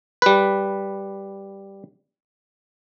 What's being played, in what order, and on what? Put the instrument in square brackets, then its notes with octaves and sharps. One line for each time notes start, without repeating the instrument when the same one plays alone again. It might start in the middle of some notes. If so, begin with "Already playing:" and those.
[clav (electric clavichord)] G3 B4